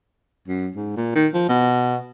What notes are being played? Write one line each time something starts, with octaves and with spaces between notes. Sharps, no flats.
F#2
G#2
A#2
D#3
F3
B2